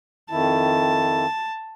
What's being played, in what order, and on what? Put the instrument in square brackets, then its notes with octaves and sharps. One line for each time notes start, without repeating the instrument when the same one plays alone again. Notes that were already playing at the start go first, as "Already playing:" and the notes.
[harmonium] F2 D#3 E4 [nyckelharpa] A5